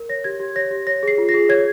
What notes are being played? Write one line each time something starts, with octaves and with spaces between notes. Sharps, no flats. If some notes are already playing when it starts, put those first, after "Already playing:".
Already playing: A#4
C#5 A#6
G4 G#6
G4
C#5 A#6
G4
C#5 A#6
G#4 C7
F4
A#6
G#4
C#5 G#6